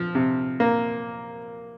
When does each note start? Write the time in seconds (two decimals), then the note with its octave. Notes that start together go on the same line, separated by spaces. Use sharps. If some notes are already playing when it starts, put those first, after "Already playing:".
Already playing: F3
0.15 C3
0.60 A#3